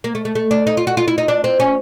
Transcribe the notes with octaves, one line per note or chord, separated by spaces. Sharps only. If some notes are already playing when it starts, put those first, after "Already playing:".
A#3
A3
A3
A3
D4
D#4
F4
F#4
F4
E4
D#4
D4
C4
C#4